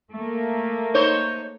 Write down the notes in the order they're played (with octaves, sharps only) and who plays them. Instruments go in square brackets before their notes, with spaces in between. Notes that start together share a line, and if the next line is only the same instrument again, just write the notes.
[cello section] A3 A#3
[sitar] D#4 C5 C#5